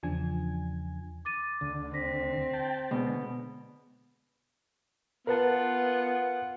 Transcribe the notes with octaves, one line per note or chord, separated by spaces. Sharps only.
E2 C#3 F3 D4 G#5 G#6
D6 A6 D#7
D2 D3
C4 A#6 B6
G5 A5
B2 D3 G#3
B3 F4 A#4 B4 F#5 A5